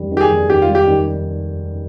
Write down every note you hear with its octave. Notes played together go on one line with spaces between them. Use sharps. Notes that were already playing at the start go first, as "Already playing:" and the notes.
Already playing: F1 D#2 G3
D#3
G4
G#4
F1
D#2 G4
F4
G3
G4
D#3